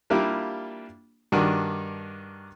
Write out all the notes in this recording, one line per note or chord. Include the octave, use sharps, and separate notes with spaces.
G3 A#3 D4 E4 F4 G4
G2 D#3 D4 F#4